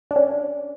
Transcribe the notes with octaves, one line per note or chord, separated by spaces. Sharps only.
D4
C#4